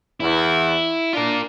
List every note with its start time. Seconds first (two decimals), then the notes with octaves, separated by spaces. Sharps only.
0.20 E2 E4
1.13 D4 F4 A#4